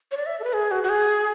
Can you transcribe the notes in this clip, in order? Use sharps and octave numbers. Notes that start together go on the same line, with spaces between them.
C#5
D5
E5
A4
B4
G#4
F#4
F#4
G#4